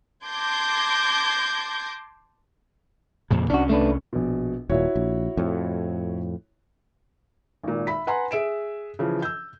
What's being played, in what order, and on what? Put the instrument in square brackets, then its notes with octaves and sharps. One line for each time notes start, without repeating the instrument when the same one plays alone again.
[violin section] A5 C6 D6 G6 G#6 A#6
[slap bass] F2 A#2 C#3
[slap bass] C2 C#4 [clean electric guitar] D4 F#4
[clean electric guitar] A3 D4 B4
[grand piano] A#1 B2
[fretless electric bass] D#1 A#2 [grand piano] E4 F#4 C#5
[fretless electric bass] A#1
F2 A2
[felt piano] G#1 A#2
E5 B5 B6
B4 F#5 G#5 A#5 C6
G#4 E5 D7 E7
C#3 E3 F3
E6 G6